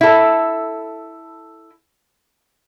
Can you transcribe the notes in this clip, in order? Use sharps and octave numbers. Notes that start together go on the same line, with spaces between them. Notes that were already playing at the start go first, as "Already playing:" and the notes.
E4 A4